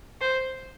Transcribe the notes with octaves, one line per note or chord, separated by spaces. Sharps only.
C5